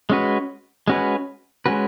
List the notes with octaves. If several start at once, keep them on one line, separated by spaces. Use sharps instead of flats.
G#3 C#4 F#4 B4
G#3 C#4 F#4 B4
G#3 C#4 F#4 B4